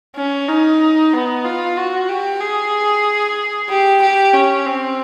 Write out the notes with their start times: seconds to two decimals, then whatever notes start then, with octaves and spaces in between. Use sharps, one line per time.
0.16 C#4
0.48 D#4
1.13 B3
1.45 F4
1.77 F#4
2.09 G4
2.41 G#4
3.70 G4
4.02 G4
4.33 C#4
4.66 C4